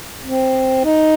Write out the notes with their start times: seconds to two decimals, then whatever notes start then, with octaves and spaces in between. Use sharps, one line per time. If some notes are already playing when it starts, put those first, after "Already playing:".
0.23 C4
0.84 D#4